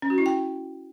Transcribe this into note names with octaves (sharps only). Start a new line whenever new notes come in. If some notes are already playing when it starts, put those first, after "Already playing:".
C#4
F#4
E4
G5